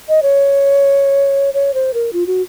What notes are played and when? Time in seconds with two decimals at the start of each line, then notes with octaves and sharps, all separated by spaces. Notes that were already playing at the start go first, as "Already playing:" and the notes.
0.09 D#5
0.23 C#5
1.54 C#5
1.74 C5
1.94 A#4
2.13 F4
2.27 F#4